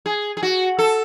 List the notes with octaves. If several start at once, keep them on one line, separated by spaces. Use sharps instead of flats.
G#4
G#4
F#4
A4